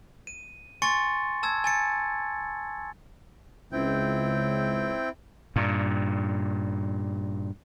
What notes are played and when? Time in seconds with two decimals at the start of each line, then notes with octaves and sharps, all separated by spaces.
0.27 D#7
0.82 G#5 C6 C#6 A6 C#7
1.43 A5 E6 G#6
1.64 G#5 A6 C#7
3.72 C#2 C4 E4 G5
5.56 G2 A#2